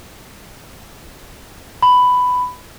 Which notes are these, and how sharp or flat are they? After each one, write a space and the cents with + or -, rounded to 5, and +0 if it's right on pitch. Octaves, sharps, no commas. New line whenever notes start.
B5 +10